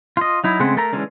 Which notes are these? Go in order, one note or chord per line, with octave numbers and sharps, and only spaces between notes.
F4 D#5
F#3 D#4 E4
C#3 G#3 A3 C4 F#5
A3 A4 A#4 A#5
D3 E3 G#3 C#4 D4